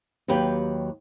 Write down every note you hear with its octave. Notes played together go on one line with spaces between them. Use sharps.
D#2 F#3 G4 B4 C#5 G5